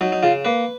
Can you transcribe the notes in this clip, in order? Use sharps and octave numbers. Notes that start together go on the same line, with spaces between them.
F#3 D#4
D#4
C#3 F4
A#3 B4